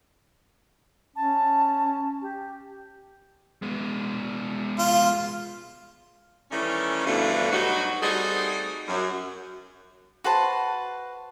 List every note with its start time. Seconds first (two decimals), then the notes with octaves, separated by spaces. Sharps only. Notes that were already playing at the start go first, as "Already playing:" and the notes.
1.16 C#4 A5
2.22 G4
3.62 G#3 B3
4.79 F4
6.51 D#3 E3 G3 A3 C#4
7.06 G2 B2 D3 E3 F3 A3
7.52 G2 F#3 B3 D#4 F#4
8.02 G3 A3 C4 D#4 F#4 G#4
8.88 F#2
10.24 F#4 B4 C5 A5